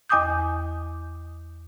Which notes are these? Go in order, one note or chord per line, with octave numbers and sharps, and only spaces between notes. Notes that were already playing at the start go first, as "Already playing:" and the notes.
E2 D#5 G#5 D6 D#6 G6